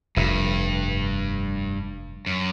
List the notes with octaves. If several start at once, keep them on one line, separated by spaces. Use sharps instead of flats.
F1 G2
F#2